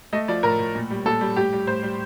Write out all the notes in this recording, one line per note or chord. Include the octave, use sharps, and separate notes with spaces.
A3 D#5
F3 D5
A2 A#4
A2
A#2
G3
A#2 A4
G3
A2 G4
G3
A2 C5
G3